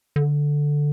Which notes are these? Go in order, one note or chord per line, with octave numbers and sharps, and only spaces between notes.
D3